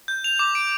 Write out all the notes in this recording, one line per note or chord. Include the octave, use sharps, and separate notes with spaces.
G6
F7
D6
D7